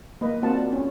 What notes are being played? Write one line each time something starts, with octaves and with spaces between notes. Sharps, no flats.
A#3 B4 D#5
A#3 C4 F4 F#4 F#5 A5
D5
C#4